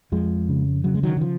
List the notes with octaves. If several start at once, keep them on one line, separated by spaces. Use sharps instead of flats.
F2 F3 G#3
C#3
C#3 F#3
G#3
D#3 F#3
D#3
F3